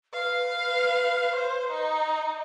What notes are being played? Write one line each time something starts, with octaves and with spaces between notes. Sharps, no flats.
B4 F5
C5
D#4